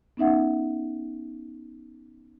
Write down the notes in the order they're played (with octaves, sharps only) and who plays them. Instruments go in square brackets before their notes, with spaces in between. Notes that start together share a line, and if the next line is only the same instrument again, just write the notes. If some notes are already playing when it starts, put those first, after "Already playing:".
[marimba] B3 C#4 D#4 E5 F#5